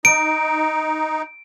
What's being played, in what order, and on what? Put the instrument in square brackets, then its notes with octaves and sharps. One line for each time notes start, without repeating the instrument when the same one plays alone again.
[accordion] D#4 [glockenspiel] D7